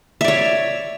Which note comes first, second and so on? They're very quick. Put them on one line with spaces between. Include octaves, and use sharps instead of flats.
E5 D5 C#5